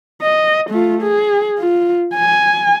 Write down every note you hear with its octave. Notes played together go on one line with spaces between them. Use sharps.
D#5
A3 F4
G#4
F4
G#5